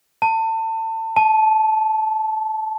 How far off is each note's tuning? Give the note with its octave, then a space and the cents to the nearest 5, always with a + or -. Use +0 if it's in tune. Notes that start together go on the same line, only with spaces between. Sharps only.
A5 +30
A5 -20